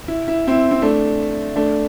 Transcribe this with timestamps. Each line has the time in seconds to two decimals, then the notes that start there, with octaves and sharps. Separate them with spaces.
0.08 E4
0.28 E4
0.47 C4 E4
0.71 C4
0.82 A3 D4
1.56 A3 D4